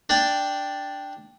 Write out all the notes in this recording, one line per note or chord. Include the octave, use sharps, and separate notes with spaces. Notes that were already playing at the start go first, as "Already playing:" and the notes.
D4 D5 G5